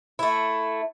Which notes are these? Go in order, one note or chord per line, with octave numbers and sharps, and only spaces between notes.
A3 E4